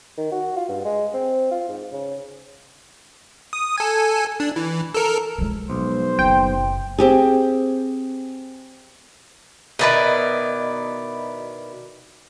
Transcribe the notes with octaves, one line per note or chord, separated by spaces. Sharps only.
D#3
F#4
F4
G2
G#3
C4
F4
G#2
C#3
D#6
A4 G#5
D4
E3
A4 A#4
F3 G#3
B1 C5
F#1 G5
C4 G4 G#4
B2 D#3 E4 B4 D5 D#5